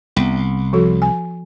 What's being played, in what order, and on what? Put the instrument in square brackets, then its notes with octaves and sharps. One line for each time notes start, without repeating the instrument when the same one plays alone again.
[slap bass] C2 [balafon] B3
[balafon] F3 F#4 A4
G#5